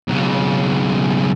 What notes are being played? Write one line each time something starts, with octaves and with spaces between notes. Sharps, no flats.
B1 C#3